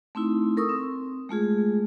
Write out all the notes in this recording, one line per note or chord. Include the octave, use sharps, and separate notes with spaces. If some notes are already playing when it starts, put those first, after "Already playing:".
A3 C4 D#4 E4
A4 A#4 C#6 D#6 E6
C4
G#3 A3 F4 G#4